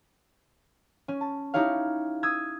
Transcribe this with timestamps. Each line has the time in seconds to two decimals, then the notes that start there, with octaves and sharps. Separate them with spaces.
1.08 C#4
1.21 A5
1.54 D#4 E4 G4 C#5 F5
2.23 D#6 E6 G#6